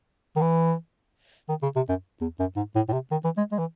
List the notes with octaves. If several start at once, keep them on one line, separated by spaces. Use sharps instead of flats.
D#3
E3
D#3
C#3
C3
F#2
E2
F#2
G#2
A2
A2
C3
D#3
E3
G#3
G#3
E3